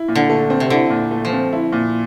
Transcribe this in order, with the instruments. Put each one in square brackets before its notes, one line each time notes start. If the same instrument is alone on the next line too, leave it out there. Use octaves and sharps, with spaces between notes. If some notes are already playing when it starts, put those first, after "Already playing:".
Already playing: [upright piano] E4
A#2
[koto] D3
[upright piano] A3
C4
[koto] C3
[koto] D3 [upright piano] E4
[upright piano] A#2
A3
[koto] F3
[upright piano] C4
E4
A#2